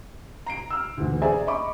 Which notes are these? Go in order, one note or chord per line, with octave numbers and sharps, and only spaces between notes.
A#5 C7 D7
E6 F6
D2 E3
G#4 C5 D5 E5 G#5 A#5
D#5 E5 B5 C#6 D6